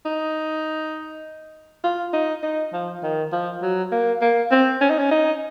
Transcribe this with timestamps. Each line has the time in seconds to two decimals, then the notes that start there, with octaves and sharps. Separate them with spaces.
0.06 D#4
1.84 F4
2.13 D#4
2.43 D#4
2.73 F3
3.03 D#3
3.32 F3
3.62 F#3
3.92 A#3
4.22 A#3
4.51 C4
4.81 C#4
4.90 D#4
4.99 C#4
5.11 D#4